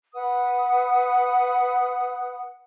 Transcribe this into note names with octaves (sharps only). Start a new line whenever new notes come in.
B4 F#5 D#6